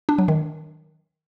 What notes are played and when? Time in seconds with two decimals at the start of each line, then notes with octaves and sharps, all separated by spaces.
0.09 D4
0.18 F#3
0.28 D#3